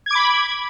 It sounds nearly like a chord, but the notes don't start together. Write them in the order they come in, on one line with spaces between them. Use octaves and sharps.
G#6 D6 B5